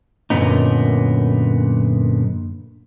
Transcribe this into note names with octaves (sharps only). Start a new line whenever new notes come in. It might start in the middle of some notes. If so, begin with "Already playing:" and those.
F#2 A#2 D3 B3 D#4